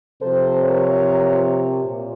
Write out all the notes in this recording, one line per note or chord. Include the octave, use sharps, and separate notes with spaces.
C3 F3 A4 C5
A#4 C#5
A#2